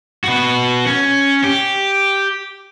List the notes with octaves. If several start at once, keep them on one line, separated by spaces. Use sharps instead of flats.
F#4 B4
C#4
G4